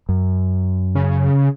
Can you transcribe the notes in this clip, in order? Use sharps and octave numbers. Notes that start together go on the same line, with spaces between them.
F#2
C#3